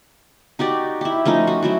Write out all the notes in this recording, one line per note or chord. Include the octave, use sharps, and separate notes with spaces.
D#4 F#4 G4 D5
E4 G4
F3 A3 C#4 D#4
F#4
F#3 E4 F#4